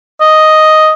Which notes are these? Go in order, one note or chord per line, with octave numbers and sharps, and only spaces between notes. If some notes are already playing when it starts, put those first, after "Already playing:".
D#5